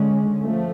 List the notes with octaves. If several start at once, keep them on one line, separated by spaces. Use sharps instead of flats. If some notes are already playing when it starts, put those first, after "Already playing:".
Already playing: D3 G#3 C#4
F3 A3